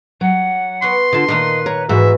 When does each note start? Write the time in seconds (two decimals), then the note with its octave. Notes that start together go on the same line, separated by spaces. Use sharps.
0.21 F#3 F#5
0.82 B3 F#4 C6
1.13 D3 F4 D#5 A5
1.28 A#2 D#3 A#3 B4 D#5
1.66 A#4 C#5
1.89 G#2 E3 F#4 E5